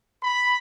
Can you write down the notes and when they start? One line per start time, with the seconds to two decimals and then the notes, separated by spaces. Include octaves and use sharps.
0.23 B5